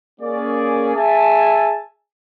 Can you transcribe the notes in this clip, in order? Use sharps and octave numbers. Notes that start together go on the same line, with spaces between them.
A#3 C#4 G#4 D5
G#4 E5 G#5 A5